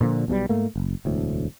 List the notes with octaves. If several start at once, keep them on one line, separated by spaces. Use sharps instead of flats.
A#2 D3 F3
B1 B2 F#3 G3
G#2 A3 A#3
F#1
E1 D2 A2